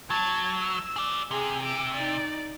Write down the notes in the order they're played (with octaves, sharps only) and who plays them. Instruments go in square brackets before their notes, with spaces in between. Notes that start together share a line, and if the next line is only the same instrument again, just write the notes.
[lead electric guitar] F#3 [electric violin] A5 G#6
[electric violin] E6
[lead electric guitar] G#4 D5
[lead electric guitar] C3 [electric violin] G#4
[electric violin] D6 E6
D#4 D5